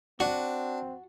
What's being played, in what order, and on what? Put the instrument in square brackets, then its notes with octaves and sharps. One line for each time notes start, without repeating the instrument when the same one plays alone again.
[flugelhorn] C4 [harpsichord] D4 [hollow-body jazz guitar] F#4